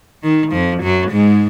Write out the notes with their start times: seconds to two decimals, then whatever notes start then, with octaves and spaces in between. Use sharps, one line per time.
0.23 D#3
0.52 F2 F3
0.82 F#2 F#3
1.11 G#2 G#3